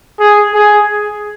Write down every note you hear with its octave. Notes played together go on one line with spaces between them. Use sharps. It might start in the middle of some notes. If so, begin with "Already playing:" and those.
G#4
G#4